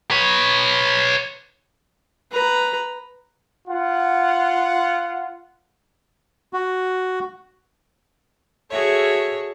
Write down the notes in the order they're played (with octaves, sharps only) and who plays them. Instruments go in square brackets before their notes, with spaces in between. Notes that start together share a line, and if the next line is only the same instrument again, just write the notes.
[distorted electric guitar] B4 C#5
[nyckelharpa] B4 A#5
[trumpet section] F4 F#5
[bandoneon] F#4
[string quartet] F#4 G#4 A4 C#5 E5